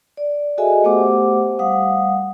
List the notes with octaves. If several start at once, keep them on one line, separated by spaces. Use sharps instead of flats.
D5
F#4 G#4 A4 D#5 E5 G#5
A3 B3 G4 C5 F#5 D6
G3 F5 F#5 D#6